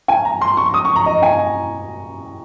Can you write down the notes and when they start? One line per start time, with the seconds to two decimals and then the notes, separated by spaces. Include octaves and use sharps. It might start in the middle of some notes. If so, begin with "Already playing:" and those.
0.08 G#5
0.25 A#5
0.41 C6
0.57 C#6
0.74 D#6
0.85 C#6
0.96 A#5
1.06 D#5
1.22 G#5